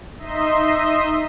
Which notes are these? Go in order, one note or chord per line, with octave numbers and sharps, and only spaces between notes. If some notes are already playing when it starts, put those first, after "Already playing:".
D#4 D#5 E5 C6